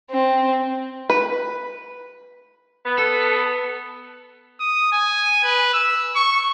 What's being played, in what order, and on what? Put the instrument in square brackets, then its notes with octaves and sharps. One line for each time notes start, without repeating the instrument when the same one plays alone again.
[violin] C4
[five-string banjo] B4
[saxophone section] B3
[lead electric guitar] A4
[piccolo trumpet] D#6
G#5
B4
E6
C#6